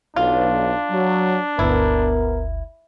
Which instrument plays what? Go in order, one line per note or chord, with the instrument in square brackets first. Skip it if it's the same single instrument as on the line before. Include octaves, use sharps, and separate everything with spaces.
[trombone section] B1 [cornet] D4 [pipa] F4
[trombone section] F#3
[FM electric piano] G1 D2 [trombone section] B3 A#4 [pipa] E4